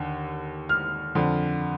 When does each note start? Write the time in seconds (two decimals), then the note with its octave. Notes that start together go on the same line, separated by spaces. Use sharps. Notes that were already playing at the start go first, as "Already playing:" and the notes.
Already playing: D#2 D3
0.69 F6
1.15 F2 D3